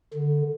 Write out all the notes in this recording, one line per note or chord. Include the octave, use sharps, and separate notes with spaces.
D3